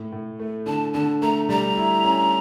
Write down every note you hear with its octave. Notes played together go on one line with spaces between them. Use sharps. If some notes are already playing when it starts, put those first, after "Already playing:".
Already playing: A2
A2
A3
D3 A5
D3 A5
A3 A#5
G3 A#5
E4
C#4